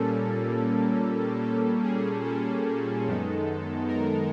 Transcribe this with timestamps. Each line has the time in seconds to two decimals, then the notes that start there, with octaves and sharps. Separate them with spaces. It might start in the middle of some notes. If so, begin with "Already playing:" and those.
Already playing: A#2 G3 A#3 C#4 A4
1.43 A4
1.84 G#4
2.25 A4
3.07 F#2 D#3 G#3 B3 D#4
3.88 A#4